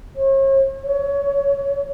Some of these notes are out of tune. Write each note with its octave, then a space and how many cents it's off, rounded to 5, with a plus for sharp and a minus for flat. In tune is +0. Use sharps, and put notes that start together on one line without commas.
C#5 -40
C#5 +20